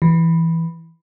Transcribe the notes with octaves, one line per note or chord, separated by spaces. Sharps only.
E3